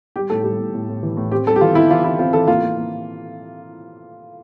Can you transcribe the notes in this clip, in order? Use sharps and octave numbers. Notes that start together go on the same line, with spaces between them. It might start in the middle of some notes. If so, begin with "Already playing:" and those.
G3 G4
A2 A4
G3 G4
A2
A2
A2
E3
A2
C4 G4
G3 A4
G4
E3 F4
E3 E4
E3 F4
E3 E4
C4 F4
E3 A4
A#3 F4
A#3
A#3